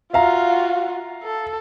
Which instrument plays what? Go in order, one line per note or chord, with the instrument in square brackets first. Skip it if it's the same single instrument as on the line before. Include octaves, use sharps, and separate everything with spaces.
[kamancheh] F4 F#4 [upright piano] E5 F5 A#5
[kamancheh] A4